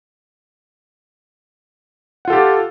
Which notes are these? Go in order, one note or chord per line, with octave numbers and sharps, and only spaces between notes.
F4 G4 A4 F#5